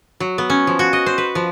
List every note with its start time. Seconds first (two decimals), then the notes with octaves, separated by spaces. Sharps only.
0.20 F#3
0.38 B3
0.50 C#4
0.67 F3
0.79 F#4
0.93 D#5
1.06 C5
1.18 B4
1.35 F3